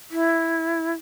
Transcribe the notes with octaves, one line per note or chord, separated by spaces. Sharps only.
E4